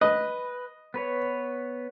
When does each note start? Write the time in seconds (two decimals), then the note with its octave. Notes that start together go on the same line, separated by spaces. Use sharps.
0.01 B4 D#5
0.94 B3 B4 C#5